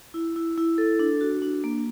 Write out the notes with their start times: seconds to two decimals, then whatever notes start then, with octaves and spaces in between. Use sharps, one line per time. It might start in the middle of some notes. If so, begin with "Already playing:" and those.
0.14 E4
0.36 E4
0.58 E4
0.78 A4
0.99 D4
1.21 F#4
1.42 D4
1.64 A#3